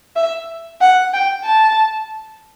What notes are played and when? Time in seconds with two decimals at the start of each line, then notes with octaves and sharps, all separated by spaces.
0.16 E5
0.81 F#5
1.13 G5
1.45 A5